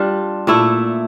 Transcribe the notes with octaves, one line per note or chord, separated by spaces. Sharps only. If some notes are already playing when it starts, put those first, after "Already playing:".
Already playing: G3 D4 F4
A#2 A3 E4 A4